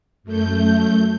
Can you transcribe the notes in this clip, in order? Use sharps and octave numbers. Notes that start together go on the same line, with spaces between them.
F#2 A3 G6